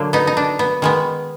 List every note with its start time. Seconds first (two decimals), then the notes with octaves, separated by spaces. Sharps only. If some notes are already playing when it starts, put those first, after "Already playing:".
Already playing: D3 F#3 A#3
0.13 B3 D#4
0.27 D#4
0.37 D4
0.59 B3
0.82 D#3 G#3 B3